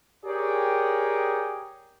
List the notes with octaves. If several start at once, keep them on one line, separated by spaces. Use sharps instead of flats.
G4 G#4 A#4 C#5 D5 G5